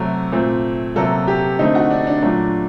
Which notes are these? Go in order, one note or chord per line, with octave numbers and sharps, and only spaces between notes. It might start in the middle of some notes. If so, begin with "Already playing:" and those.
Already playing: C3 F#3 A3
A#2 A3 C4
C3 F#3 A#3 A4
G4
D3 A3 C4 D#4
F#4
D4
D4
A#2 F#3 A3 D4